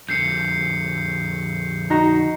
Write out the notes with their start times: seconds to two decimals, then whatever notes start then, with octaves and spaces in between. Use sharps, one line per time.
0.09 F2 D3 G6 C7 C#7
1.90 D#4 F#4 A#5